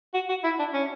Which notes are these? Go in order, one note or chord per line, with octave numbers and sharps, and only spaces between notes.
F#4
F#4
E4
D4
C#4